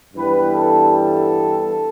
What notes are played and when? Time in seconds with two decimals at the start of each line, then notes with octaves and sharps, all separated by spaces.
0.14 G2 E3 G3 B3 B4
0.51 A4
0.88 A4